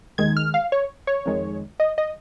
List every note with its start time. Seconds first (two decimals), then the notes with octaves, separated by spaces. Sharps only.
0.18 D#2 D#3 G#3 G#6
0.37 F6
0.54 F5
0.72 C#5
1.07 C#5
1.25 F2 D#3 G#3
1.80 D#5
1.98 D#5